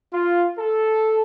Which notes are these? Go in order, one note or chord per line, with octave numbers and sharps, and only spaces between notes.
F4
A4